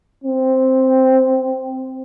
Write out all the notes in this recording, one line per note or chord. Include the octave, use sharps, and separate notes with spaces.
C4